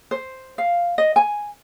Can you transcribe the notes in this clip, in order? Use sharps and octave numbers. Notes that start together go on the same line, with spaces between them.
C5
F5
D#5
G#5